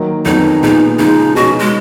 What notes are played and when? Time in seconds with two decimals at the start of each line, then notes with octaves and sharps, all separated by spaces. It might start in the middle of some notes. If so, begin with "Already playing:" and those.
Already playing: D#3 F#3 A#3
0.25 F2 D#3 F#3 B3 D#4 F#4
0.62 A#2 G#3 B3 D#4
0.99 C#3 F3 G#3 D#4
1.35 B2 G#3 C#4 F#4
1.60 G#3